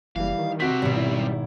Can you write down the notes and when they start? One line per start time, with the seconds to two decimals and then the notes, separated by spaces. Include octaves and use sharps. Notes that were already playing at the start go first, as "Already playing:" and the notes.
0.16 F#1 E3 G3 F5
0.38 D#3
0.60 B1 C3 C4 F#4 B6
0.82 G#1 B2 G3
0.97 E4